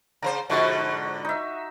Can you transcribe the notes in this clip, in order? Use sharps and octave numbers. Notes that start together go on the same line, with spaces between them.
C#3 A#4 C5 A#5
G#2 B2 D3 F3 F#4 C#6
D#4 E5